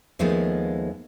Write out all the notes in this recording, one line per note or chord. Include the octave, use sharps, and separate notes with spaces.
D#2 F3 G#3 A3 B3 D#4